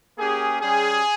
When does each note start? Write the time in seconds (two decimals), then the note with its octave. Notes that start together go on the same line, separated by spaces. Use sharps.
0.18 A#3 C#4 G4 G#4
0.60 G3 C#4 G4 G#4